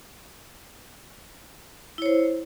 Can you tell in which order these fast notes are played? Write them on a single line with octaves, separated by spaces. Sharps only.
E4 C#5 C5